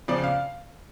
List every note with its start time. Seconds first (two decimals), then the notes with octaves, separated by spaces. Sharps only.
0.08 F2 C#3 F3 D5
0.24 F5